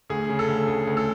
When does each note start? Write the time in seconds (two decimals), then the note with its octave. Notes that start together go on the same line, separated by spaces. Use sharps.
0.10 D2 G#4
0.29 C#3
0.39 A4
0.49 D2
0.67 D2 G#4
0.87 D2
0.97 A4